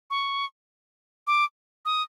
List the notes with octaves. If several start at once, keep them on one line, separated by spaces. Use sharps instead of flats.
C#6
D6
D#6